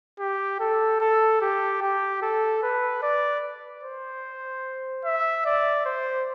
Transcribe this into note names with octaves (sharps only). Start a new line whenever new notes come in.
G4
A4
A4
G4
G4
A4
B4
D5
C5
E5
D5
C5